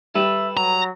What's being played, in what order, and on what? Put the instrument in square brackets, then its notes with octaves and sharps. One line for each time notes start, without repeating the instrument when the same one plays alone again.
[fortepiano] G3 [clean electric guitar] A4 B4 [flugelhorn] E5
[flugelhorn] F#3 [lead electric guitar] A#5